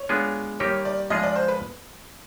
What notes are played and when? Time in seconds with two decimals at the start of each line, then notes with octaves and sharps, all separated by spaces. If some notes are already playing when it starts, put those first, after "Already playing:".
Already playing: C#5
0.09 G#3 B3 D4 F4 G#4
0.60 D#3 G3 A#3 D#4 G4 C#5
0.85 D5
1.10 F3 G#3 C#4 F4 G#4 D#5
1.23 D5
1.36 C5
1.48 B4